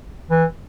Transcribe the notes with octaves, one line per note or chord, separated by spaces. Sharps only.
E3